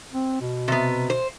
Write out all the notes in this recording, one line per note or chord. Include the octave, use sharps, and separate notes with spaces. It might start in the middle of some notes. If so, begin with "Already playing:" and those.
C4
B2
C3 B3
C5